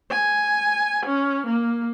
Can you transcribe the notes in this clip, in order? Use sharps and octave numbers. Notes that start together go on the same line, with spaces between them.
G#5
C#4
A#3